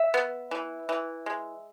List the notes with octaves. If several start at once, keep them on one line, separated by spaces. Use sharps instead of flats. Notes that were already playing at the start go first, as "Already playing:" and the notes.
Already playing: E5
B3
E3
E3
G#3